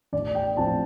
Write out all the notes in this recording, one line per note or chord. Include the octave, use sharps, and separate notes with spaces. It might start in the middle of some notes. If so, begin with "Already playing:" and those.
A1 D5
G5
A2 F3 C4 A5